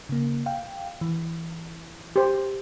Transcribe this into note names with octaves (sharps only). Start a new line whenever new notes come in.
C#3 A#3
F5 G5
E3
G4 C5